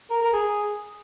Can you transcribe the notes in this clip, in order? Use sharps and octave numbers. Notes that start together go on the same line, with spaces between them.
A#4
A#4
G#4